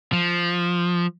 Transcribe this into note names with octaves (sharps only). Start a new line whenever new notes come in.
F3